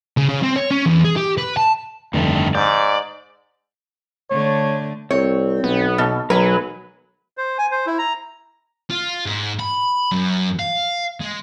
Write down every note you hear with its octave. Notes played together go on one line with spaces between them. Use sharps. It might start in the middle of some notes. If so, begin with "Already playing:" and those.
C#3
C#3
C4
C#5
C#4
E2
G#4
G4
B4
A5
F1 G2 D3 D#3 A3
G#2 D5 G6
D3 A3 C#5
C2 C4 C#5
B1 B3
B2
B1 F#3 A#4 B4 G#5 B5
C5
G#5
C5
E4
A#5
F4
G#2
B5
F#2
F5
G#3